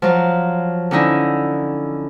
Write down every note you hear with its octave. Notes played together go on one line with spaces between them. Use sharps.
F3 F#3
D3 C#4 D#4 E4